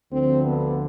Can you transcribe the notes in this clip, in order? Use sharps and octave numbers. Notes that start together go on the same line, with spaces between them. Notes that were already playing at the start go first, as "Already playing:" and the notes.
D2 D3 F3 C4
B3